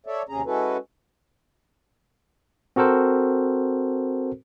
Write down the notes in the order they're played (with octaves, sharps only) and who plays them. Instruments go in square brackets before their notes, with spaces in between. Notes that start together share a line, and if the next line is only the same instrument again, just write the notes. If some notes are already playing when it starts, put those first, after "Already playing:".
[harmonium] A4 C#5 D5 E5
D#2 C3 C#4 G#4 A#5
G#3 C#4 E4 F#4 A4 B4
[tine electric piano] C4 F#4 A4 A#4 C5